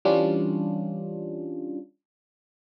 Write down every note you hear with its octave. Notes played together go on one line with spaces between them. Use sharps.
E3 G3 C#4 D4 F4